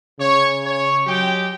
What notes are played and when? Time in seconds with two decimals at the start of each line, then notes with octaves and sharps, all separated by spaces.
0.19 C#3 C#5
0.64 C#5
1.07 F#3 G#3 G4 G5